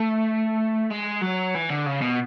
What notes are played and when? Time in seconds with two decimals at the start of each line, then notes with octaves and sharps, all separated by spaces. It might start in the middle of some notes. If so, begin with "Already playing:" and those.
Already playing: A3
0.91 G#3
1.22 F#3
1.55 E3
1.70 D3
1.86 C#3
2.02 B2